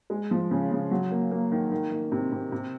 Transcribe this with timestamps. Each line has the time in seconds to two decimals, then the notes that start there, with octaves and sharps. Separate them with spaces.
0.10 G#3
0.31 F3
0.51 C#3
0.71 C#3
0.91 F#3
1.11 A#3
1.31 A#3
1.52 D#3
1.72 D#3
1.92 D#3
2.12 C3
2.32 C3
2.52 C3